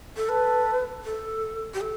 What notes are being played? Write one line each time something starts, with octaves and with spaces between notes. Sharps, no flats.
A4
A4 B4
A4
G4
A4